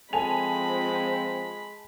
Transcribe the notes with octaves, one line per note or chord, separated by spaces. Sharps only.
F3 G#3 C4 A4 G#5 B5 F7